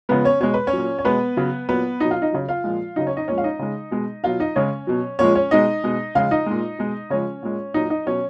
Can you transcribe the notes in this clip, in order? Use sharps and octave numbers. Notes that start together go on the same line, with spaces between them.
C#3 F3 G#3 B3 B4
C#4 C#5
B2 G#3 C#5
B4
C#4 C#5
A#2 F#3
C#5
B2 G#3 B3 B4
C#3 F#3
A#2 F#3 B3 B4
B2 F#3 D#4 D#5
F4 F5
D#4 D#5
C#3 F#3
F4 F5
A#2 F3 G#3
C#3 F#3 D#4 D#5
C#4 C#5
D#4 D#5
A#2 F3 G#3 C#4 C#5
F5
D#4 D#5
C#3 G#3
B2 G#3
B2 F#3 F4 F5
D#4 D#5
C#3 G#3 C#4 C#5
B2 F#3
A#2 F3 G#3 C#4 C#5
C#4 C#5
B2 G#3 D#4 D#5
B2 G#3
C#3 F3 G#3 F4 F5
D#4 D#5
A#2 G#3
B2 G#3
C#3 F3 G#3 C#4 C#5
A#2 G#3
A#2 F#3 D#4 D#5
D#4 D#5
B2 F#3 C#4 C#5